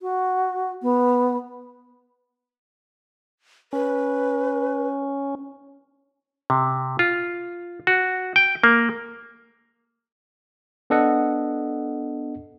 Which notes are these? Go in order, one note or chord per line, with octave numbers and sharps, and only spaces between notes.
F#4
B3
C#4 B4
C3
F4
F#4
G5
A#3
B3 D4 A4 D#5 F#5